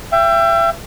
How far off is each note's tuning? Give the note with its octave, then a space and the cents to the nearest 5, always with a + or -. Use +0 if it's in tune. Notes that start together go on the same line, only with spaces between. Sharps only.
E5 +35 G5 +0